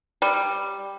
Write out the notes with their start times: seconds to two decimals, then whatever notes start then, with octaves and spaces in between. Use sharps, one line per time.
0.22 G3